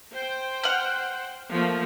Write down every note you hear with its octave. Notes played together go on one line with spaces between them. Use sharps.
C5 G5
F#5 F6
F3 A3 A#3